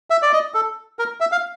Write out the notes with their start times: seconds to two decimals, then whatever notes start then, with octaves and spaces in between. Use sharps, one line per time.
0.10 E5
0.22 D5
0.33 D#5
0.54 A4
0.99 A#4
1.20 E5
1.32 F5